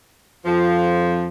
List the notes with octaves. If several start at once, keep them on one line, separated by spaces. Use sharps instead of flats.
F2 F3